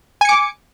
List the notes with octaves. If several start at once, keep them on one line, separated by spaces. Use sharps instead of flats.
G#5 D6 C#7